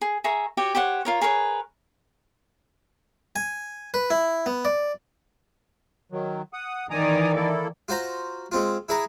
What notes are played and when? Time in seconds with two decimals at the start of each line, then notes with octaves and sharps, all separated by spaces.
0.01 G#4
0.24 G#4 E5 A#5 C#6
0.57 F#4 G4 C#5 G5
0.75 G4 C5 C#5 F#5
1.05 F4 A#4 C#5
1.21 G#4 A#4 B4 C#5
3.36 G#5
3.94 B4
4.10 E4
4.46 B3
4.65 D5
6.12 D#3 F#3
6.53 F#5 D#6
6.91 D#3 E3 D5 G#5 A#5 D#6
7.35 A#3 E4 A4
7.88 F4 F#4 C5 A#5
8.52 G#3 C4 F4
8.89 E4 G#4 B4 A#5